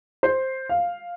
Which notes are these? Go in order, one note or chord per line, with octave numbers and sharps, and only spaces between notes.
C5
F5